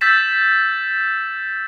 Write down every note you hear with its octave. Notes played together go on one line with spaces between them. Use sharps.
E6 G6 A6 B6 E7